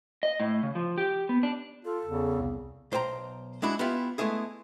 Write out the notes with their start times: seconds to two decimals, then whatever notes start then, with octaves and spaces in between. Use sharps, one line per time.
0.23 D#5
0.40 A2
0.63 C#3
0.75 F3
0.98 G4
1.29 B3
1.43 D4
1.85 F4 A4
2.04 E2 C#3
2.40 C2
2.92 B1 C5 G5 A5 A#5
3.62 G#3 D4 E4 F#4
3.79 B3 E4 F4 G4 E5
4.18 G#3 A3 B3 E4 G#4